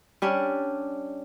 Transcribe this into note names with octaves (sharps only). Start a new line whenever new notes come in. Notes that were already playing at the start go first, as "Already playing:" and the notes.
G3 C#4 D4